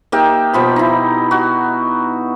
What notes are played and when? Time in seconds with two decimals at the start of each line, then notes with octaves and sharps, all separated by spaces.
0.12 A#3 D#4 G4 E5
0.53 B2 F3 B5
0.76 D#4 E4
1.31 F#4